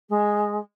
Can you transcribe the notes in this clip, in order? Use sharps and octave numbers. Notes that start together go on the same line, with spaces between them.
G#3